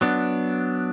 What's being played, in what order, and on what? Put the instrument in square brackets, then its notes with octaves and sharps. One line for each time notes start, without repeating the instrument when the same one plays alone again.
[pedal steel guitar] F#3 B3 D4